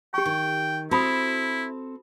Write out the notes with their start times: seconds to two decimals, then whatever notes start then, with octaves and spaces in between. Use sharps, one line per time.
0.14 G4 G5 C#6
0.26 D#3
0.91 C4 E4 F#4 A4 B5 D#6